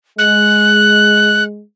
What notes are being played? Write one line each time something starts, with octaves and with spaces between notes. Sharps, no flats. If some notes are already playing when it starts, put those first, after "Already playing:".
G#3 F#6